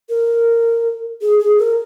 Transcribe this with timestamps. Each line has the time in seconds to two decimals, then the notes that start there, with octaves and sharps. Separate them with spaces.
0.09 A#4
1.22 G#4
1.39 G#4
1.59 A#4